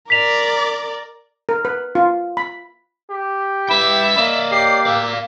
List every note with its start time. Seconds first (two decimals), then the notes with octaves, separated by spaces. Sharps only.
0.10 A#4 D5 B6 F7
1.49 A#4
1.65 B4
1.95 F4
2.37 B5
3.11 G4
3.69 E4 B4 E5 G5
4.17 A#3 D5 D#5
4.52 G4 C7
4.86 D5 F5 E6